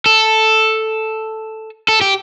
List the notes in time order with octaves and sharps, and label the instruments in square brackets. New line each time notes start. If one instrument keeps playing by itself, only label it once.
[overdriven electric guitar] A4
A4
G4